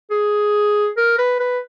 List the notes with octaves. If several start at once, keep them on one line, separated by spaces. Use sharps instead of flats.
G#4
A#4
B4
B4